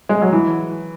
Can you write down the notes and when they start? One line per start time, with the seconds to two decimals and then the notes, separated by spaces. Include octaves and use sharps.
0.09 G#3
0.22 F#3
0.33 E3